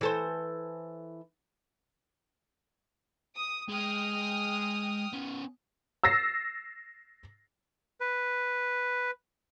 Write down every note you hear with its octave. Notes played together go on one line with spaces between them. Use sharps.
E3 A4 C5
D#6
G#3 G5 D#6 F6
B3 C#4
E6 A6 A#6 C7
B4